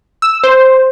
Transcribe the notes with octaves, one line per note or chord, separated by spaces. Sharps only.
E6
C5